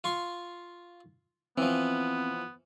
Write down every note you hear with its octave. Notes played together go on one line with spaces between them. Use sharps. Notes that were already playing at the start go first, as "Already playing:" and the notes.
F4 C6 C#6
E3 F3 B3 C4